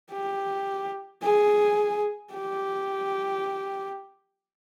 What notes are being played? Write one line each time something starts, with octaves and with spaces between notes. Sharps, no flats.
G4
G#4
G4